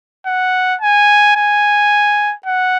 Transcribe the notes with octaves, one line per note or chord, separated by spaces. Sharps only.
F#5
G#5
G#5
F#5